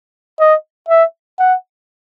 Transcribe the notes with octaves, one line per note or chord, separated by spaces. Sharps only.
D#5
E5
F#5